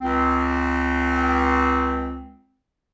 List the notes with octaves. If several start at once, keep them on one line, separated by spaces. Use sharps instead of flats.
C#2 C4